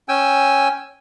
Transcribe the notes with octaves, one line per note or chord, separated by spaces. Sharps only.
C#4 G5 G#5 E6